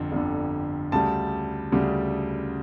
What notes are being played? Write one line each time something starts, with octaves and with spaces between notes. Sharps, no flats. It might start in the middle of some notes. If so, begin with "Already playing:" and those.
Already playing: G1 F2 D3
G1 F2 D3
D2 C#3 G3 A5
D2 C#3 G3